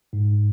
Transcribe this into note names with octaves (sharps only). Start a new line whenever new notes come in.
G#2